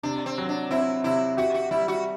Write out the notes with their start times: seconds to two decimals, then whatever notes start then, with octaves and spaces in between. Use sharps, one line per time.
0.03 C3 D4
0.26 C4
0.38 F#3
0.49 D4
0.71 C4 E4
1.04 C3 E4
1.37 F#4 G4
1.54 F#4
1.71 G3 E4
1.88 F#4